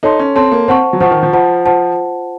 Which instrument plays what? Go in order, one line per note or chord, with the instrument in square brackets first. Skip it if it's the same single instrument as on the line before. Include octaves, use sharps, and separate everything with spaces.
[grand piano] D#4 [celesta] A4 C#5 A5 C6
[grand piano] C#4
[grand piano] C4 [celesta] A4 C#5 A5 C6
[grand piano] A#3
[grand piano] C4 [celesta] C5 F#5 A5 C#6
[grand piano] F#3
[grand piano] F3 [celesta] C5 F#5 A5 C#6
[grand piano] D#3
F3
[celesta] F4 C5 F#5 A5
F4 C5 F#5 A5